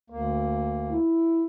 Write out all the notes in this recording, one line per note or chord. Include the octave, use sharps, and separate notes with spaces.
D2 A#3
E4